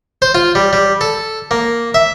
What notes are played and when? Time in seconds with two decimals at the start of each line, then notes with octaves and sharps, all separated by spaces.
0.22 C5
0.35 F4
0.55 G3
0.73 G3
1.01 A4
1.51 A#3
1.94 E5